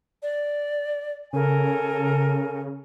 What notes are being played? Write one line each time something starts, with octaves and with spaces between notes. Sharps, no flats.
D5
C#3 A4 A#4 G#5